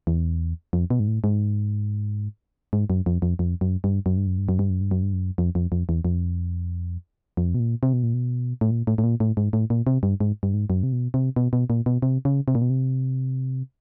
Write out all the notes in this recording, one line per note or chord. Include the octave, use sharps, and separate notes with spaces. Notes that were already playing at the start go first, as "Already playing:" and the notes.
E2
F2
B2
G#2
A2
G#2
G#2
F#2
F2
F2
F2
F#2
G2
F#2
G2
F#2
G2
F#2
G2
F#2
G2
F#2
G2
F#2
F2
F2
F2
E2
F2
F2
B2
A#2
C3
B2
A#2
B2
A2
A#2
A2
A2
A#2
A2
G#2
A2
A#2
C3
G2
G#2
G2
G#2
F#2
C3
B2
C3
B2
B2
A#2
B2
C3
C#3
C3
A#2
B2
C3